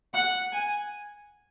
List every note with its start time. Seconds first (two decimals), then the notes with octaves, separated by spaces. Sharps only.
0.14 F#5
0.53 G#5